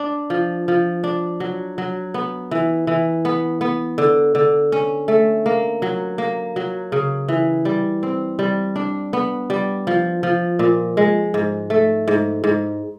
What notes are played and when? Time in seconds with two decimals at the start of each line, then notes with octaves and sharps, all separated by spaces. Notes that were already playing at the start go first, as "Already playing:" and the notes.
Already playing: D4
0.30 F3
0.68 F3
1.04 D4
1.40 F#3
1.78 F#3
2.14 B3
2.51 E3
2.87 E3
3.25 B3
3.61 B3
3.98 D3
4.35 D3
4.72 C#4
5.08 A3
5.46 A#3
5.82 F#3
6.18 A#3
6.56 F#3
6.92 C#3
7.28 E3
7.65 G3
8.03 C4
8.39 G3
8.76 D4
9.13 B3
9.50 G3
9.87 F3
10.23 F3
10.59 A#2
10.97 G#3
11.34 G#2
11.70 A3
12.08 G#2
12.44 G#2